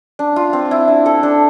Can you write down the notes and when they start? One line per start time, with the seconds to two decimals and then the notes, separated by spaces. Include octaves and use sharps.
0.19 D4
0.36 F4
0.53 C4
0.71 E4
0.88 D4
1.06 A4
1.23 D4